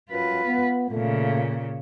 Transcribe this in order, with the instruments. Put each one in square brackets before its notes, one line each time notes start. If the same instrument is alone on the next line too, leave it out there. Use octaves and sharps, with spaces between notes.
[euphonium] F#2 [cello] F4 B4
[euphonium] B3
[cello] A#2 C#3 [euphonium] A3